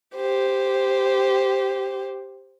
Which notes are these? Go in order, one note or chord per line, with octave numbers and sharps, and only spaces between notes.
G4 C5